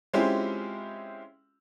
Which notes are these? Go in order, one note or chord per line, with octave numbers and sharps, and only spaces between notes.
G#3 C4 C#4 E4 F4 G4